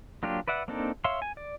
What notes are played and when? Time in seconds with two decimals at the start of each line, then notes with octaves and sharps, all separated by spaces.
0.23 F#3 A#3 D4 F4 G4
0.48 B4 D5 E5 F#5
0.68 A#3 C4 D4 D#4 A4
1.04 C#5 E5 F5 C6
1.22 G#5
1.37 D5